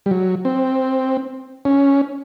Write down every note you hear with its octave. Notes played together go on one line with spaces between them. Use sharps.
G3
F#3
C4
C#4